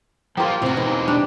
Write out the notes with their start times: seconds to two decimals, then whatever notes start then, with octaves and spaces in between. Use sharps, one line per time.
0.37 F3 G#3 A#3 F4 G4 C5
0.62 A2 C3 C4 F4 F#4
0.77 B2 E3 G#3 A#3 D#4
1.08 D4 G4 D5